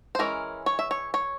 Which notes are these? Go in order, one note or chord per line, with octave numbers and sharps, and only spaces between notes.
C5
E3 G#3 C#4 A#4
C#5
E5
C#5
C#5